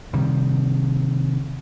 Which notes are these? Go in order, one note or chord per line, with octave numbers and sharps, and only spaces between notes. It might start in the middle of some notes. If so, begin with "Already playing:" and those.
C3 D#3 G3